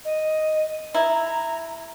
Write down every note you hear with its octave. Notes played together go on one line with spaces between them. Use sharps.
D#5
E4 A#5